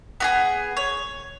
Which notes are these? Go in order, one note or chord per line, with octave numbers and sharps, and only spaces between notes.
B3 F#4 G#4
C#5